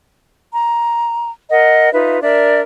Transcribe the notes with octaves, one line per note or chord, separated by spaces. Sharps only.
A#5
A#4 D#5 F#5
D#4 F4 B4 E5
D4 A#4 D5 E5